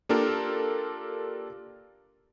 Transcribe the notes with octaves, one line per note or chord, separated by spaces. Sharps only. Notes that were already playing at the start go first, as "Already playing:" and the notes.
A#3 D4 F4 G4 A4 A#4